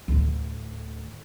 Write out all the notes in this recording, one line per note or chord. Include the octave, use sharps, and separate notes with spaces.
D2 A2